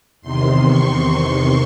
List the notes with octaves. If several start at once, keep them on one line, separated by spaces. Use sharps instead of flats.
E2 C3 D#3 C6
C#6